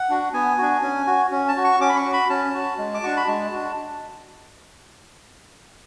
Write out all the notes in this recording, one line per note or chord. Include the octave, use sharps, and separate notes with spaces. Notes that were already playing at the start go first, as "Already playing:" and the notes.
Already playing: F#5
D4 F#4
B3 G#5
D4 F#4
C#4
F#4
C#4
A5
F#4
C#6
C#4 D6
B5
C#6
F#4
B5
C#4 A5
F#4
G#3
D6
D4 F#4 C#6
B5
G#3 A5
D4 F#4